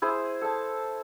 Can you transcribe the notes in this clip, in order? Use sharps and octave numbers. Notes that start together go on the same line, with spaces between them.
E4 G#4 C5 C6
A4 A5